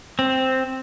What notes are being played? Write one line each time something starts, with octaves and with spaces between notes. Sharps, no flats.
C4